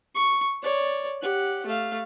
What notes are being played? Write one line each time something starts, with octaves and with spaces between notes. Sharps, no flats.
C#6
C#5 D5
G4 F#5
A3 F5